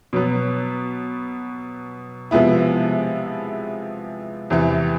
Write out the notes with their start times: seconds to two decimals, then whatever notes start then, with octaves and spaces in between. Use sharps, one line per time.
0.13 B2 F#3 B3
2.31 C3 F3 G#3 B3 E4
4.50 E2 C3 E3